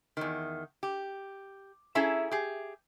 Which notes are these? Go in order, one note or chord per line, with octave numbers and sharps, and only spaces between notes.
E2 D#3
G4
C#4 E4 G#4 A4 E5 A#5
G4 G#4